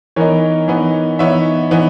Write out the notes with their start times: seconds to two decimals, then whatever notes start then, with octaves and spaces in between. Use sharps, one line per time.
0.16 E3 B3 D#4 A#4 C#5
0.68 E3 B3 D#4
1.19 E3 B3 D#4 C#5 E5
1.71 E3 B3 D#4